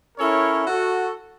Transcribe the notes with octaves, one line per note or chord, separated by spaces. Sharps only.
C#4 E4 A4 A#4 C#5
F#4 A4